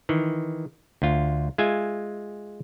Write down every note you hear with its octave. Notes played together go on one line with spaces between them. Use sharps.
D#3 E3
D2 F4
G#3 F4 E5 G#5